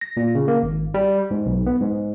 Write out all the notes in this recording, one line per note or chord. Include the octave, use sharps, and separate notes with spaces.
A#6
A#2
C#3
A#3
G#1
G3
G#2
B1
B3
G#2